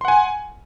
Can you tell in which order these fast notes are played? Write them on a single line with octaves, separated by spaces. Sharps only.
C6 F#5 G#5